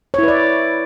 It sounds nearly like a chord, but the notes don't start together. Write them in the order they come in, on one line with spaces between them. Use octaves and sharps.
C#5 E4 B4 D5